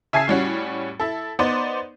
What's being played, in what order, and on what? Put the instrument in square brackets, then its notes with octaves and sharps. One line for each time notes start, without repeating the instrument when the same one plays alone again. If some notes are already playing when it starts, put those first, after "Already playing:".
[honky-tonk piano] C#3 E5 G#5 A5 G#6 C7
A2 G3 C#4 F#4
E4 A4
B3 D#4 C5 D5